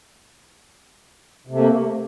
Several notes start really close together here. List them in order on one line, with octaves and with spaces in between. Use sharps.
C3 A3 A#3